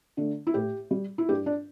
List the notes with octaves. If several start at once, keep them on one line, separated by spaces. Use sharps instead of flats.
D3 A3
E4
A2 G4
G3
E4
G2 G4
D4